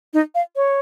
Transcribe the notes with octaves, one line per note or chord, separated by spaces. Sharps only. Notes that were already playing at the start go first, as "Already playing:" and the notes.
D#4
F5
C#5